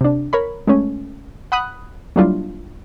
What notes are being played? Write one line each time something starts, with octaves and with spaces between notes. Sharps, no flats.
C3 D4
A#4 C#5 B5
G#3 A3 C#4
F#5 B5 D#6 F#6
F#3 G3 A#3 D4 E4 F4